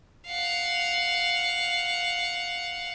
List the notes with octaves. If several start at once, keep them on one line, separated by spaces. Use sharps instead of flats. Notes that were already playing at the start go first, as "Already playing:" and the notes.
F5 F#5